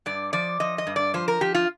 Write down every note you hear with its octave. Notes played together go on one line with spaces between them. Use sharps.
G2 D5
F3 D5
F3 D#5
D#5
G2
D5
F3 C5
A#4
F3 G4
F4